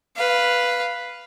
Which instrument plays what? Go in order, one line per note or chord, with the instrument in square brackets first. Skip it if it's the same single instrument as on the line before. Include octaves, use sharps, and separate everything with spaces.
[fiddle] B4 F5